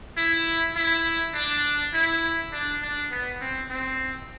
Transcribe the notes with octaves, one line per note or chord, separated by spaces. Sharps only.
E4
E4
D4
E4
D4
D4
B3
C4
C4